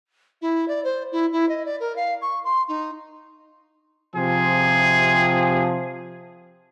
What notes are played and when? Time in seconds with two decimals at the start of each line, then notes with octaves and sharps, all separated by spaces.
0.41 E4
0.68 D5
0.84 C5
1.11 E4
1.32 E4
1.48 D#5
1.65 D5
1.80 A#4
1.95 F5
2.21 C#6
2.44 C6
2.68 D#4
4.15 C3 F3 G#4